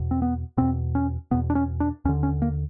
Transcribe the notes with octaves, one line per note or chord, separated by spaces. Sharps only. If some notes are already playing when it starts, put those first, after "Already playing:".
Already playing: E2 B2
C4
B3
E2 B2 C4
C#4
E2 B2 B3
D4
C#4
D4
D#2 D3 C#4
C#4
A#3